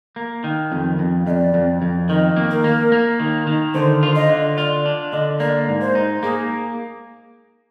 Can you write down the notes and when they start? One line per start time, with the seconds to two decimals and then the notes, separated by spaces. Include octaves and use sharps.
0.16 A#3
0.44 D#3
0.72 F2
0.99 F2
1.26 F2 D#5
1.30 D5
1.54 F2
1.82 F2
2.09 D#3 D#5
2.36 A#3
2.51 A#4
2.64 A#3
2.92 A#3
3.20 D#3
3.47 D#3
3.74 D3 C5
4.03 F4
4.15 D#5
4.30 D3
4.58 F4 D5
4.86 D4
5.12 D3 D#5
5.40 A#3 D5
5.68 G#2
5.81 C5
5.95 D#4
6.23 A#3 G#4